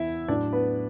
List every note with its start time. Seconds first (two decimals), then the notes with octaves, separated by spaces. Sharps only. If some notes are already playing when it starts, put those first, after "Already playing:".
Already playing: E2 E4 E5
0.28 A2 F#3 D4 D5
0.53 B3 B4